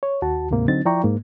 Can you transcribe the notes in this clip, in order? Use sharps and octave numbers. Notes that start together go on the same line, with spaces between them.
C#5
D#2 F#4 A5
D2 G#2 C3 A#3
D3 F#3 C4 D#4 A6
F3 E4 D5 G5 A#5 C#6
G#2 A#3